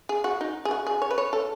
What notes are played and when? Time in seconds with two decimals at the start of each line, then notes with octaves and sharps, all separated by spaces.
0.09 G#4
0.24 F#4
0.41 D#4
0.65 G#4
0.71 F#4
0.87 G#4
1.02 C#5
1.11 B4
1.18 C#5
1.33 A4